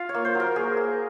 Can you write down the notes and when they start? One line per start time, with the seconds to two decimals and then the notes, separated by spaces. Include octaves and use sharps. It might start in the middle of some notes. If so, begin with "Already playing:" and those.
Already playing: F4 F5
0.09 C#5
0.14 A#3
0.25 C5
0.35 F#3 A#4
0.56 A#3 G#4
0.77 A#3